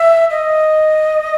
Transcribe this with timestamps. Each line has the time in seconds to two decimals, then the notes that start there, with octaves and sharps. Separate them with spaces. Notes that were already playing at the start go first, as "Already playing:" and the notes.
Already playing: E5
0.30 D#5